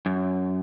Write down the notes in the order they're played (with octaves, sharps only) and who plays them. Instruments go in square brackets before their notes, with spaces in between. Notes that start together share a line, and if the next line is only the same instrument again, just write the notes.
[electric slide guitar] F#2